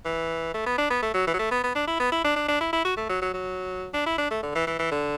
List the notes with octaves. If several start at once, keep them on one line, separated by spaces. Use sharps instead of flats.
E3
A3
B3
D4
B3
A3
F#3
E3
F#3
A3
B3
B3
D4
E4
B3
E4
D4
D4
D4
E4
E4
F#4
A3
F#3
F#3
F#3
D4
E4
D4
A3
D3
E3
E3
E3
D3